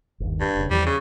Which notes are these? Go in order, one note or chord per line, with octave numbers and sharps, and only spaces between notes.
G1 D#2
G2
F1 C#3
E2 E3 F3 G3
C#3